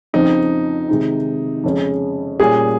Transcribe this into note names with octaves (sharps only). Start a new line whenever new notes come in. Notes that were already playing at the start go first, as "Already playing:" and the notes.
F2 C#3 F3 C4 D#4
C3 D#3 G#3 D#4
F2 C#3 G#3 C#4
A#2 G3 C#4 F4 G#4